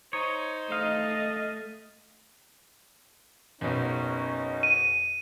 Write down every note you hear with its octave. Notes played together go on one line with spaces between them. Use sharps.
D#4 C5 C#5
A3 D#5 F5
F#1 B2 C#4 D#4
D#7